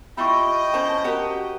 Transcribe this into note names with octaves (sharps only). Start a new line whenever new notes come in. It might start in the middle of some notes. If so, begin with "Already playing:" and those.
E4 F4 G4 D#5 G5 B5 C#6
C#4 C5 A5
F#4 G4 A#4